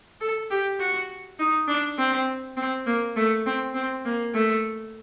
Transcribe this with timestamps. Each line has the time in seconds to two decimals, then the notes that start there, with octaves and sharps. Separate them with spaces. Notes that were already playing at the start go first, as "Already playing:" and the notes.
0.21 A4
0.51 G4
0.79 F#4
1.39 D#4
1.68 D4
1.98 C4
2.57 C4
2.86 A#3
3.17 A3
3.46 C4
3.74 C4
4.05 A#3
4.34 A3